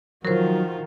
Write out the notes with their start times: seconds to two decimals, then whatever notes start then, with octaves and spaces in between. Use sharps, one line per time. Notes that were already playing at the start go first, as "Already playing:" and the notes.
0.25 D#3 F3 F#3 F4 F#4 A#4 C5